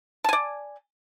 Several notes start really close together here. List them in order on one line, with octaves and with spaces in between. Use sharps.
A5 G#5 D5